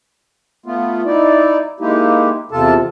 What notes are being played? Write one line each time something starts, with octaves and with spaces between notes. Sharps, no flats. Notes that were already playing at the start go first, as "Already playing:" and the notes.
A3 B3 F4
D#4 E4 D5
G#3 A#3 D#4 E4 G4
E2 C3 F4 A4 A5